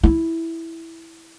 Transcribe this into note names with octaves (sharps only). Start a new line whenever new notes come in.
E4